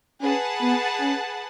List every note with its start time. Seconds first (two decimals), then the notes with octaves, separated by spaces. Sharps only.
0.21 C#4 G#4 B4 F#5 A5
0.62 B3
1.01 C#4